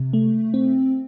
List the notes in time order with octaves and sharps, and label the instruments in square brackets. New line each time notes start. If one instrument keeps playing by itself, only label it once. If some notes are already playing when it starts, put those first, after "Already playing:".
Already playing: [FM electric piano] C3
A3
C4